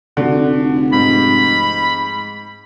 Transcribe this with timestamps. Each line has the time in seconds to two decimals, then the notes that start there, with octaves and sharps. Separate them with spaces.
0.17 F1 D3 F#4
0.92 G#2 B5